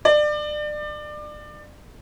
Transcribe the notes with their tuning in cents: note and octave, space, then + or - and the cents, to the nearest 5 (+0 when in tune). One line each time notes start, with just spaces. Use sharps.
D5 +30